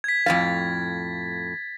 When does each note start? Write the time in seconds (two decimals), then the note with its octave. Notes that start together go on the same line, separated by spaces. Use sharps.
0.04 G#6 B6
0.26 F2 A2 F5 A6